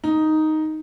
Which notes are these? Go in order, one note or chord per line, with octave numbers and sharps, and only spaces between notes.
D#4